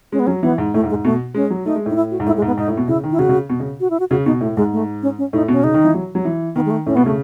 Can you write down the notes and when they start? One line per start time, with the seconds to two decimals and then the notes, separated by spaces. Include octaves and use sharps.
0.12 G#3 C#4
0.20 B3
0.27 F#3 C#4
0.42 E3 B3
0.58 G#2
0.74 A2 A3
0.84 G#2
0.89 G#3
0.94 G#2
1.04 B2 A3
1.35 G#3 C#4
1.50 F#3
1.65 A3 D#4
1.76 G#3
1.86 A2 D#4
1.96 E4
2.11 F#4
2.20 G#2
2.27 A2 E4
2.37 G#3
2.42 G#2 B3
2.57 G#2 D#4
2.68 A2
2.77 B2
2.88 C#3 E4
3.03 D#3
3.12 E4
3.19 C#3 F#4
3.29 C#3
3.49 B2
3.60 C#3
3.80 F#4
3.90 E4
4.00 F#4
4.10 C#3 F#4
4.26 B2 D#4
4.41 A2 A3
4.56 G#2 G#3
4.72 A3
5.03 C#4
5.18 C#4
5.33 A2 D#4
5.48 B2 C#4
5.64 C#3 D#4
5.74 D#3
5.85 E3
5.94 F#3
6.15 F#3
6.25 E3
6.55 D#3 B3
6.66 G#3
6.71 A3
6.86 A2 C#4
6.95 B2 B3
7.05 C#3 A3